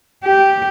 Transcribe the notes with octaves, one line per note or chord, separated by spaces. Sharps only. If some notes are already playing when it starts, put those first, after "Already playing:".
G4